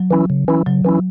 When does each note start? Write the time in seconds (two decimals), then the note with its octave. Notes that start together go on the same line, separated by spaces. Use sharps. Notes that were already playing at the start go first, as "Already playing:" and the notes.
Already playing: F#3
0.11 E3 C#4 E4
0.30 C#3
0.48 E3 C#4 E4
0.67 C#3 F#3
0.85 E3 C#4 E4